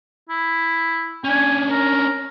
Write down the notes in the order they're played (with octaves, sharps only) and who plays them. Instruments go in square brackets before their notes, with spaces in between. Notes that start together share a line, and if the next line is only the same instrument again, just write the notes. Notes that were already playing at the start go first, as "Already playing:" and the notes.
[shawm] E4
[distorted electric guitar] C#4 D4 [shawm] G#5
[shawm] A#4